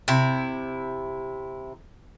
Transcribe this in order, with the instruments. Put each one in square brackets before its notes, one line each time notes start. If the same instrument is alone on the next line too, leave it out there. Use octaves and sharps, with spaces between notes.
[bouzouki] C3 E4